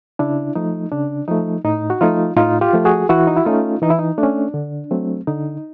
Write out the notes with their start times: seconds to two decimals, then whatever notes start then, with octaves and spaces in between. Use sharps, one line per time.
0.19 C#3 D4 E4
0.55 F3 A3 D#4
0.92 C#3 D4
1.28 F3 A3 D#4
1.64 A2 D#4
1.90 F#4
2.01 F3 A3 D#4 F4
2.36 A2 D#4 F4
2.61 F4 G4
2.73 F3 A3
2.85 F#4 G#4
3.09 E3 E4 F#4
3.27 D#4
3.37 E4
3.45 A3 C#4 D#4 F4
3.82 E3 D#4
3.90 E4
3.99 D#4
4.18 A3 D4
4.23 C#4
4.54 D3
4.91 F#3 A3 C4
5.27 D3 D#4